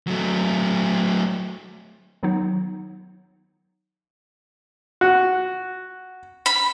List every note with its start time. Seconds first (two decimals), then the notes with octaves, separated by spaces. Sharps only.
0.07 F#3 A3
2.23 D#3 F#3 B3 D#4
5.01 F#4
6.46 B5